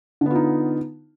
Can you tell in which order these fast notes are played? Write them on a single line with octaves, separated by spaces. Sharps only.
D3 B3 F4 D#4